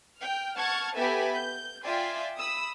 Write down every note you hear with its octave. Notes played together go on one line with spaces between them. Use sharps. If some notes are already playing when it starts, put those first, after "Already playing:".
G5 F6
F#5 A5 C#6 F6 G#6
B3 G4 A4 E5 G#5 B5
G6
F4 D5 E5 G5 G#5 C6
B5 D#6 E6